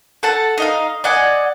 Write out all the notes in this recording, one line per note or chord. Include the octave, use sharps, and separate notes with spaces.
A4 F#5 A5
D#4 D#5 F5
D5 D#5 F#5 G#5